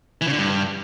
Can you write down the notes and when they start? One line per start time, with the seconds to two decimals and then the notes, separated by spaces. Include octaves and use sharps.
0.21 E3
0.27 C#3
0.33 D3
0.38 G2